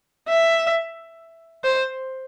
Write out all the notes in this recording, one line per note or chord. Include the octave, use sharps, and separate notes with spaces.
E5
C5